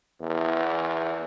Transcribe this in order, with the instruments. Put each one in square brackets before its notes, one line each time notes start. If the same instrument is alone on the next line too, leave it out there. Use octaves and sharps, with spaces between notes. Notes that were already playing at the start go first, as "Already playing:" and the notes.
[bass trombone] E2